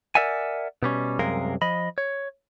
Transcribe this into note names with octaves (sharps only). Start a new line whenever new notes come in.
A#4 D5 E5 F#5 G#5
B2 G3 C#4
C2 F#2 C3 G#3 A#4 F5
F3 D#5 B5
C#5